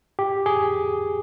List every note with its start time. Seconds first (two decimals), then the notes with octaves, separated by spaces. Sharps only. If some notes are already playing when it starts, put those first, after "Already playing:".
0.19 G4
0.46 G#4